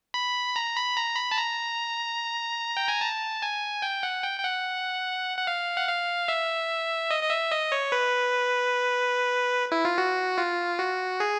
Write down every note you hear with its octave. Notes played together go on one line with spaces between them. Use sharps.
B5
A#5
B5
A#5
B5
A5
A#5
G5
G#5
A5
G#5
G5
F#5
G5
G5
F#5
F#5
F5
F#5
F5
E5
D#5
D#5
E5
D#5
C#5
B4
E4
F4
F#4
F4
F#4
G#4